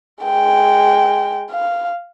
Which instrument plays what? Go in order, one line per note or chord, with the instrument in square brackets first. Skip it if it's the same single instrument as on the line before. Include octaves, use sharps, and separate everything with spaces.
[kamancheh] G#3 G5
F5